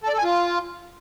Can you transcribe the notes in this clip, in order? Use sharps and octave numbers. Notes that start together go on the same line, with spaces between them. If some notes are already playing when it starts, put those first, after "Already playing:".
A4
D5
A4
G#5
F4